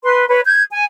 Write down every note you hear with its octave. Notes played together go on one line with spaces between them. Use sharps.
B4 C6
B4 C#5
G6 G#6
G#5